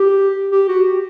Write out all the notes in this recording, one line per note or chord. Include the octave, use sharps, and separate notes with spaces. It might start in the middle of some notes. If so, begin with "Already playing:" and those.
Already playing: G4
G4
F#4
G4